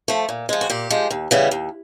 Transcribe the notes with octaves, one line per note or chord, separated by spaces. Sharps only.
F3 A3
A#2
F3 G#3
F#4
A#2 G4
F3 G#3
D#2
C#3 E3 G3 B3
D#2